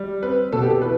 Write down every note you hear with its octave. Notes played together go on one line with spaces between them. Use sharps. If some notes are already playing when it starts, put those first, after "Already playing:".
Already playing: G3
C4 B4
B2 A4
G4
A4
E3 B4